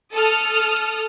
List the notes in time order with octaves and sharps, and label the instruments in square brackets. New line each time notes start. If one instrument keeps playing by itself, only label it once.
[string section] A4 D#6 F6